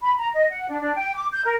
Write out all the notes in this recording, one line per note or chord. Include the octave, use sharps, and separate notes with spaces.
B5
A#5
D#5
F#5
D4
D4
G5
D6
G6
A#4